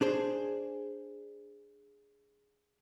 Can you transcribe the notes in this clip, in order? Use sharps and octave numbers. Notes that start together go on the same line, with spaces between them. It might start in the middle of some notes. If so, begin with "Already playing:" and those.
D4 G#4 C5